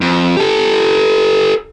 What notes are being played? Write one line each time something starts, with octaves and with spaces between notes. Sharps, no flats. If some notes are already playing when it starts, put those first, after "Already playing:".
F2
G4 A4